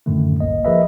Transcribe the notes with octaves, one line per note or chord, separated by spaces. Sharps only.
F#2 A2 D3 D#3 A3
G1 C2 A#3 D#5
F3 G#4 A#4 B4 D#5 E5